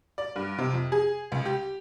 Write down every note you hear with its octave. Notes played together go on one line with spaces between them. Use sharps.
D5
G2
C3
F2
G#4
C#2
G4